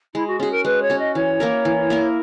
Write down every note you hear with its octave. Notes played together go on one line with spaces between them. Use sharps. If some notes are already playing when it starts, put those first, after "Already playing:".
G#3 E4
F#4
C#4 F#4 G#4
A#4
G#3 B4
C#5
C#4 F#4
D#5
E3 C#5
A#3 E4 A#4
E3
A#3 E4 A#4